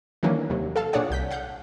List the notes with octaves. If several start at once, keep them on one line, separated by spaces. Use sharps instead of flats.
D#3 E3 F#3 A#3 C#4 D4
D#2 C3 F#3
A4 F5 A5
A#2 D4 G#4 C#5 D5 F#5
C2 G6 B6
F5 F#5 G6